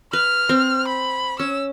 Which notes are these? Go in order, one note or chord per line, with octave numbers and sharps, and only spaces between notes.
B4 F6
C4
B5
C#4 E6